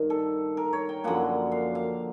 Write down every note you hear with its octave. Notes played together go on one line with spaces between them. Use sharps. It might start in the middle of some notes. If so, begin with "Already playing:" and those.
Already playing: G2 D#3
A4
A#4
C#5
G5
F#2 D3 F3 A#3 F#5
F5
F5